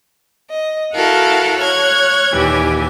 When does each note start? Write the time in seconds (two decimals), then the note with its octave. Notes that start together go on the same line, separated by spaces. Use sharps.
0.51 D#5
0.93 E4 F#4 A4 A#4 F5 F#5
1.59 C#5 F6 F#6 G#6
2.33 D#2 A#2 E3 G4 G#5